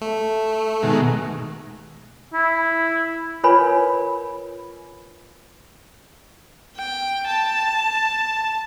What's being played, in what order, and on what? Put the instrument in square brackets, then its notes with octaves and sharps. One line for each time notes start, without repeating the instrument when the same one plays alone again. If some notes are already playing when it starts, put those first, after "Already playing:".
[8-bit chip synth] A3
[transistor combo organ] B2 D#3 G#3
[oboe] E4
[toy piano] F4 A#4 B4 C#5 G#5 B5
[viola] G5
A5